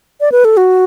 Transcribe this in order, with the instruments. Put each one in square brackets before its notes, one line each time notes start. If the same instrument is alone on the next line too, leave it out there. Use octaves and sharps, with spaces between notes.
[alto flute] D5
B4
A4
F#4